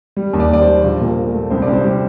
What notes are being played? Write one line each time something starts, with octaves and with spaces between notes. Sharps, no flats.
G3
D#2
D5
D#2 D5
C5
G3
A#1
A#2
A#2
A3
C2 C5
D5
C2
C5
G3 G4